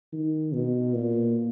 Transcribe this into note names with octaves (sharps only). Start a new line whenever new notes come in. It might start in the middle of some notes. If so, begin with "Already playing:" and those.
D#3
B2
A#2